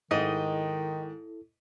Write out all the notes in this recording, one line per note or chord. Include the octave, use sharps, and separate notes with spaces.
G#2 D#3 E4 A4 D#5